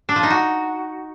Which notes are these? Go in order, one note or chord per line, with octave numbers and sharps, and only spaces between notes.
D4
F3
D#4
F#4